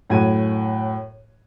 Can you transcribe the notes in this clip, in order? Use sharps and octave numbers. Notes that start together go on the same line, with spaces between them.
F#2 A2 F#4 G#6 D#7